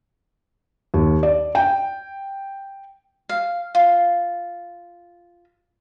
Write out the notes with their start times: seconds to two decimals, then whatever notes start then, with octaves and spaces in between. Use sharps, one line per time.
0.94 D#2
1.23 D5
1.55 G5
3.29 F5
3.75 F4